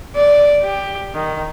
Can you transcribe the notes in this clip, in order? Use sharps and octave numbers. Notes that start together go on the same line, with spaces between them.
D5
G4
D#3